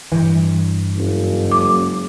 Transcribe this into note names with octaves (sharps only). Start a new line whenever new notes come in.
G2 E3
F#1
F#3 G#3 D6